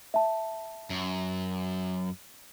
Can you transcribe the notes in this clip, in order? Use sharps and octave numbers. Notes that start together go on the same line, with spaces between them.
E5 A5
F#2